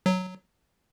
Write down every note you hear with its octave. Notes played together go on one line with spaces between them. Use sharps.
F#3